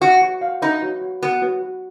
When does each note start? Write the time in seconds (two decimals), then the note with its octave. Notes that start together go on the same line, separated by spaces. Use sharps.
0.01 F#4 B4
0.22 F#4
0.41 F5
0.62 D#4 B4
0.83 F#4
1.02 F#4
1.23 B3 F#4
1.42 F#4
1.62 F#4